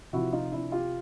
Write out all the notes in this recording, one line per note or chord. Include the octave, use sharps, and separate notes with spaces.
C3 F3 E4 F#4
D#4 F4
D4 E4
F4 G4